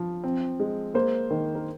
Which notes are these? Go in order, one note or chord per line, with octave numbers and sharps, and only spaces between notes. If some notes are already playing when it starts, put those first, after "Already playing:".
Already playing: F3
C4
G#3
A#3 C5
D#3
A#4